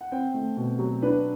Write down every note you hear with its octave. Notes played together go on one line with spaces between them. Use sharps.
F#5
C4 G5
A3
B2
F#3
D4 B4